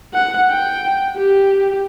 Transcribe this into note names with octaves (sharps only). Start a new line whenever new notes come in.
F#5
G5
G4